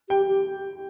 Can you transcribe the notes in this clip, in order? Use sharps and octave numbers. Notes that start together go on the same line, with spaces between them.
G4 G5
G4